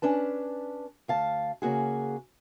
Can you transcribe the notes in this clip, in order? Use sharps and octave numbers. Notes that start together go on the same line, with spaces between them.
C#4 D4 B4 A5
D2 F5 A5
C#3 A#3 F#4 G#4